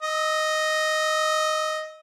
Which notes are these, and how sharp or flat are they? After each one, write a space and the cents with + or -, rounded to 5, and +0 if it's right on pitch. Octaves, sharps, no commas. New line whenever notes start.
D#5 +0 E6 -40